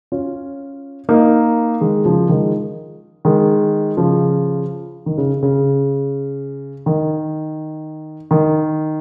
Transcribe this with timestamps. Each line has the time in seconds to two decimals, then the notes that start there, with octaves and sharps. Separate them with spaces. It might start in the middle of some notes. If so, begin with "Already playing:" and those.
0.12 C#4 F4
1.09 A#3 D#4
1.81 D#3 G#3
2.05 C#3 F3
2.29 D#3 G#3
3.25 D#3 G#3
3.97 C#3 F3
5.06 D#3
5.18 C#3
5.43 C#3
6.86 D#3
8.31 D#3